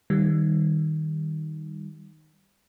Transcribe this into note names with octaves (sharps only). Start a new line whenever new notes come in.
D#3 G3